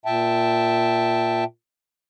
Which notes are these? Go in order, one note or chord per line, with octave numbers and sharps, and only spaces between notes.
A#2 E5 G5 A5